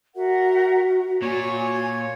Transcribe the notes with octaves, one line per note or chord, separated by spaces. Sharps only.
F#4 A#4 E5 F#5
A#2 C#5 G#5 C#6